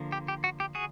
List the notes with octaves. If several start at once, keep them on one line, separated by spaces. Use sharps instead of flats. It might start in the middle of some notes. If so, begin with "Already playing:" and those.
Already playing: D3 F3 A#3
G4
G4
F#4
G4
F#4 G#4